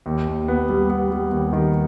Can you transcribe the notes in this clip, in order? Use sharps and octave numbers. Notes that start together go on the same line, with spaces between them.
D#2
D#2
B3
G3
B3
G3
D#2
D#3